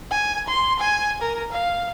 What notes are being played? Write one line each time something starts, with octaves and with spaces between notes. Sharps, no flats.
G#5
C6
G#5
A#4
F5